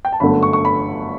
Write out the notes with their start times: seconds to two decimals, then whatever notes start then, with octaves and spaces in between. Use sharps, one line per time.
0.05 G5
0.12 A5
0.20 G1 F#2 D3 A3 B5
0.43 C#6
0.53 C#6
0.65 B5